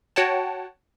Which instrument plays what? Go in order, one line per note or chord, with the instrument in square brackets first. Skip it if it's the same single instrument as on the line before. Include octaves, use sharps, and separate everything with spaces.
[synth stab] F#4 C#5 F#5 G5 A5